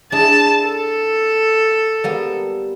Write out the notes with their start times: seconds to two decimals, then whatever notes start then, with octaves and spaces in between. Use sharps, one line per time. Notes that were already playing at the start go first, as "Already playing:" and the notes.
0.12 D4 E4 G#4 A5
0.65 A4
2.04 G3 A#3 B3